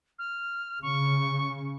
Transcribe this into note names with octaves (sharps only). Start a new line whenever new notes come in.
F6
C#3 C#6